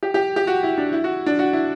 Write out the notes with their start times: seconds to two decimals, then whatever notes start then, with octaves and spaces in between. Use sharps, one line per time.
0.03 G4
0.14 G4
0.36 G4
0.47 F#4
0.63 E4
0.78 D4
0.93 E4
1.04 F#4
1.26 D4
1.39 F#4
1.53 E4